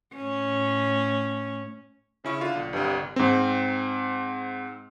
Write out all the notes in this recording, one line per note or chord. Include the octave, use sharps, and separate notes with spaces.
A2 C#4
C#3 C#4 E4 C#6
D3 F4
B1
G1 C2 G2
G#2 C4